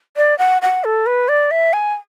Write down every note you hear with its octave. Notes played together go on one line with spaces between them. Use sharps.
D5
F#5
F#5
A4
B4
D5
E5
G#5